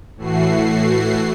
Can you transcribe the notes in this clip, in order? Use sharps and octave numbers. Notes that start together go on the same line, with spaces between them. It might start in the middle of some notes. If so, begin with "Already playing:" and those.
A2 E3 A3 F#4 C7